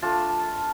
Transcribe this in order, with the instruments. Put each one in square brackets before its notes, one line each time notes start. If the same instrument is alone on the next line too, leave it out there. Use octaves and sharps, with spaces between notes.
[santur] A3 D4 F4 A5